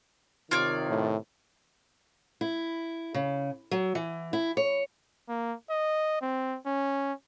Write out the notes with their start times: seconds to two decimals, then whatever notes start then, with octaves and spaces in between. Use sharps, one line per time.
0.51 C3 D#3 F4 C#5 D5
0.89 A2
2.41 E4
3.14 C#3
3.71 F#3
3.95 E3
4.33 E4
4.57 C#5
5.29 A#3
5.70 D#5
6.21 C4
6.66 C#4